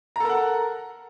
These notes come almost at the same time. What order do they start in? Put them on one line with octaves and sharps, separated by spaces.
A#5 A4 A#4 F#5